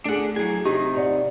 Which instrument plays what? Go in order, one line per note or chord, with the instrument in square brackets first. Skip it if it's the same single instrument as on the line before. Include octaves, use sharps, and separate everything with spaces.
[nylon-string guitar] A3 G#4 [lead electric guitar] D4 F#5
[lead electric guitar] F#3 G#5 [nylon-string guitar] E4 G#4
[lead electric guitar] C3 D#4 [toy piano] G4
[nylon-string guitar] C#5 D5 F#5